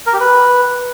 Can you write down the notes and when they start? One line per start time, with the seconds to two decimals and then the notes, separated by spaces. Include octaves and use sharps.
0.07 A#4
0.13 G4
0.20 B4